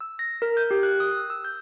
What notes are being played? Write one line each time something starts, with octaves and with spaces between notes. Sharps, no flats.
E6
A#6
A#4
G6
G4
F#6
D#6
E6
E6
G6